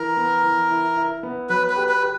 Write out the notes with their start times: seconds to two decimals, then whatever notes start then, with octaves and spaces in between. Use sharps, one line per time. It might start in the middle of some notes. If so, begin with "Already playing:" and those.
Already playing: E3 A#4
0.17 B3
0.43 E3
0.71 E4
0.96 E4
1.23 B3
1.49 F#3 B4
1.70 B4
1.76 G4
1.89 B4
2.03 G4